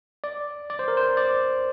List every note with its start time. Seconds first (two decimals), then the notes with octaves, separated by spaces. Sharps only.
0.24 D5
0.70 D5
0.79 C5
0.88 A#4
0.97 C5
1.17 D5